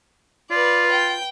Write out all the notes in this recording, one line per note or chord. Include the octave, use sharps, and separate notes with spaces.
F4 B4 D5
G5